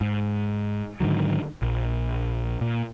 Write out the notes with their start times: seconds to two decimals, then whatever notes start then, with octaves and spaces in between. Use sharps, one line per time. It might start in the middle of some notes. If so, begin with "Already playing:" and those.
0.01 G#2
1.00 G#2 D3 D#3 F#3
1.62 A#1
2.61 A#2